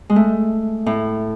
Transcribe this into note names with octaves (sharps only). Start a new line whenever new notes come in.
G#3
A3
A2